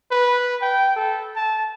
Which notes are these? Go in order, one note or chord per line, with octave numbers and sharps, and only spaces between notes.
B4
G5
A4
A5